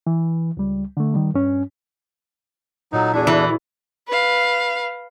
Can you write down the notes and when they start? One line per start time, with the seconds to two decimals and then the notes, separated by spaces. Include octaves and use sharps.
0.07 E3
0.57 C#2 G3
0.97 D3 A3
1.14 D#3 G3
1.34 G2 C#4
2.93 A#2 F#3 D#4 A4
3.13 E2 D4 E4 F#4 G#4
3.27 E3 D5
4.08 B4 F5